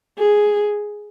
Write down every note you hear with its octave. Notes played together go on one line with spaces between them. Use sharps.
G#4